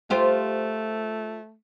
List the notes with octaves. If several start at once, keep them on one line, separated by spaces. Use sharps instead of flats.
A3 F4 G4 C5